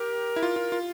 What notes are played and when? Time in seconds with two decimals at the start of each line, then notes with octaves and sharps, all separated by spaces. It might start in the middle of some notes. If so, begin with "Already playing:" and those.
Already playing: G4 A#4
0.36 E4
0.43 F4
0.56 F4
0.72 F4